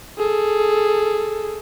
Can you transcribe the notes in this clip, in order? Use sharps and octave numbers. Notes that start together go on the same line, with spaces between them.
G#4 A4